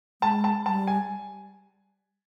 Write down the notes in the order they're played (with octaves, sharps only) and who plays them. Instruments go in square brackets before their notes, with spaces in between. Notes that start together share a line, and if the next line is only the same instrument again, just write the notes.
[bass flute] G#3 [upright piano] A5
[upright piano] A5
[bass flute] G3 [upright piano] A5
[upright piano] G#5